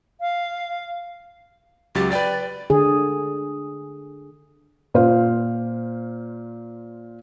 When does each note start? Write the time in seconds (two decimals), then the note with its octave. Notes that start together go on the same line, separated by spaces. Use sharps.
0.21 F5
1.95 C#2 F#3 G4 A6
2.11 B4 D5 G5 A6
2.70 D3 G#4
4.94 A#2 C5 F5